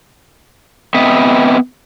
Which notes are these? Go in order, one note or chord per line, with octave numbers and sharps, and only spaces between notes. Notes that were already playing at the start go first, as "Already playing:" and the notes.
B3 C4 D#5 E5